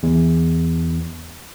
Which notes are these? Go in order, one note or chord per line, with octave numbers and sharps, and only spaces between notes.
E2